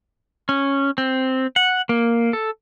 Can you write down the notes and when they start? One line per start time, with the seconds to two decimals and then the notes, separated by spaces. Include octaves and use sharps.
0.49 C#4
0.98 C4
1.56 F#5
1.89 A#3
2.33 A4